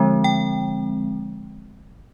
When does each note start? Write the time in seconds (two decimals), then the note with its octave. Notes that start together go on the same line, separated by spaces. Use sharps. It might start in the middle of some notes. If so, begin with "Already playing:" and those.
Already playing: D3 F3 G#3 C4
0.24 G5